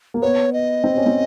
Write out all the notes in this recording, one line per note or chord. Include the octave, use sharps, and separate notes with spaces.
A#3
B3 C#5
D#5
C4
C#4
C4